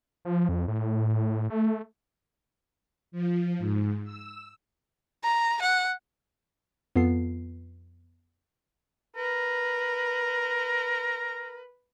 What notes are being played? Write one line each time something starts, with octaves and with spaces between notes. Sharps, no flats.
F3
F2
A2
A3
F3
G#2
E6
A#5
F#5
F2 B3 F4 A4 C7
A#4 B4